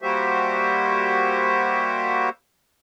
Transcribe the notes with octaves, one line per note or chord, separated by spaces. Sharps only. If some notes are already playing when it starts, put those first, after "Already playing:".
G3 A#3 F#4 G4 C5 E5